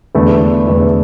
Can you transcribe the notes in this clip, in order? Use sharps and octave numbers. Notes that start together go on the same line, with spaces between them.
E2 D3 A3 E4 B4
E2 D3 A3 E4 B4